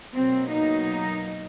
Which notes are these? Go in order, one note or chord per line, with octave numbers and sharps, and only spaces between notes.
B2 F#3 A#3 C4
D#4